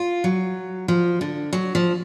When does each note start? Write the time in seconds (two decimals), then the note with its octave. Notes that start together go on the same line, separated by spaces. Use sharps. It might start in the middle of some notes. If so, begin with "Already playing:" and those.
Already playing: F4
0.24 F#3
0.88 F3
1.21 D3
1.53 F#3
1.75 F3